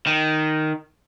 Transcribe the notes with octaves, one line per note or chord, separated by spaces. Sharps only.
D#3